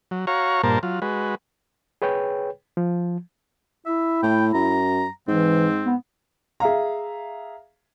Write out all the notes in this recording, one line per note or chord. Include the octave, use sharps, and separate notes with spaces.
F#3
F#4 C#5 F5 A#5 C#6
G2 A#2 A#3 A#4 C5 A5
F#3 F4
G#3 F#4 B4
G#4 B4 C#5 G5
F3
E4 E5
A2 G5
F#2 A#5
G#2 E3 C4
B3
G#4 E5 F5 A#5